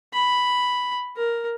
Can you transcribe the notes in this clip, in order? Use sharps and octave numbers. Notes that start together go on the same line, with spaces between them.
B5
A#4